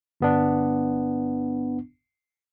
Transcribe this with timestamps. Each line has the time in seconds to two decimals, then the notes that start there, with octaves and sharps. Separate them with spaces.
0.21 G1 B3 D4